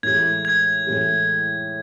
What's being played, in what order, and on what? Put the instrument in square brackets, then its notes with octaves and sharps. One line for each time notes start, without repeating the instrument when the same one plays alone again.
[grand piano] A2 E3 G#3 [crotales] G#6
[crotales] G#6
[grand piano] A2 E3 G#3